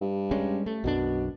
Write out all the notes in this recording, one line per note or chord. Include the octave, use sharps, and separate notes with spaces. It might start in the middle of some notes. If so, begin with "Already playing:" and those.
G2
G3 G#3 C#4
A3
B1 F#2 B2 D4